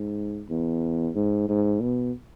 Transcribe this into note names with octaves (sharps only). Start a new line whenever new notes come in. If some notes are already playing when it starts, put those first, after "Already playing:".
Already playing: G#2
E2
G#2
G#2
B2